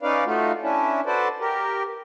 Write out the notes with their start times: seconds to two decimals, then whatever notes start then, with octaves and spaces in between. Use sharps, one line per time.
0.03 C#4 D#4 B4 D5 F5
0.25 A3 D#4 F4 F#4
0.62 C#4 D4 E4
1.06 F#4 A4 B4 C5 D5
1.40 G4 A#4